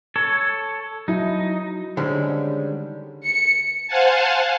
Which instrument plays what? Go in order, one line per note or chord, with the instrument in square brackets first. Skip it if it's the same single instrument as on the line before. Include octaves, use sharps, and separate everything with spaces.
[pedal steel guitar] A4 C#5
[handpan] F#3 E4 [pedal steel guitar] D#4
[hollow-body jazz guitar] D3 D#3 G3 G#3 C4 C#4
[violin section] C#7
[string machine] C5 F5 F#5 G#5 A5